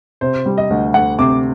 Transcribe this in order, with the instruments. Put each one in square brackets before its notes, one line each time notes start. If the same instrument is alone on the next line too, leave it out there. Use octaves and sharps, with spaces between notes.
[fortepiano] C3 [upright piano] C5
[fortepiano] G3
[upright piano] D#5
[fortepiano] D2
[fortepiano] D2 [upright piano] F#5
[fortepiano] C3 [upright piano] D6